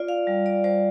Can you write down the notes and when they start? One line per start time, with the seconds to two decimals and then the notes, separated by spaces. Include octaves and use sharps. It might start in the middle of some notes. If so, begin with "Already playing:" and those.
Already playing: F4 D5
0.08 F5
0.27 G3
0.46 D5
0.64 G3 C5